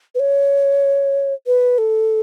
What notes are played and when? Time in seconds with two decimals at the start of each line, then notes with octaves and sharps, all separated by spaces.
0.15 B4
0.20 C#5
1.47 B4
1.78 A4